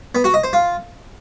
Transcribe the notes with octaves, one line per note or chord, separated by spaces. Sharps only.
B3
F#4
D#5
C5
F4